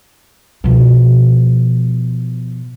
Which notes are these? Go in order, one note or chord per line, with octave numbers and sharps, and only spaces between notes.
B2 F3